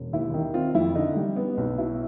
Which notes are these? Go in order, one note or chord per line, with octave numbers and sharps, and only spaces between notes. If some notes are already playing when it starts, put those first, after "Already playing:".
Already playing: E1
D#2 E4
D#3
C4 F4
F2 E4
D3 D#4
G3
B3
B1
B2 E4